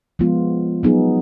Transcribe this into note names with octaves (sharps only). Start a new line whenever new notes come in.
F3 G#3 B3 F4
F#3 B3 D#4 G#4